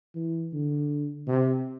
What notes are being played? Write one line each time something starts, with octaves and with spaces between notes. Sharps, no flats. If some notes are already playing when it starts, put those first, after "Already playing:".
E3
D3
C3